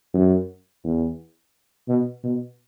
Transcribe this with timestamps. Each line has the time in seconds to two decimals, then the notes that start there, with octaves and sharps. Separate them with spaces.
0.14 F#2
0.84 E2
1.88 B2
2.24 B2